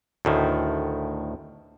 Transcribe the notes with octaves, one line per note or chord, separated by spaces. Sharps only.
D2 A2 D#3